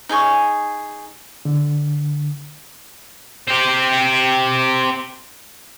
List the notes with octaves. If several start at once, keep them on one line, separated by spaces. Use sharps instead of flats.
D#4 G#4 G#5 C#6
D3
C4 G4